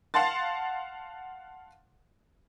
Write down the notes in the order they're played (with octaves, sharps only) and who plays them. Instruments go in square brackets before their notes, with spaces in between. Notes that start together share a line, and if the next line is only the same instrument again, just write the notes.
[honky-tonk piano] F5 F#5 A5 C6 A6